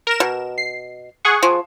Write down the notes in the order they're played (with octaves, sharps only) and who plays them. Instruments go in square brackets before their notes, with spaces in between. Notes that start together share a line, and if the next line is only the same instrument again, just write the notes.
[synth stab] A#4 E7
[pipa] B2
[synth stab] C7
G#4 F#5 C#6
[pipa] F3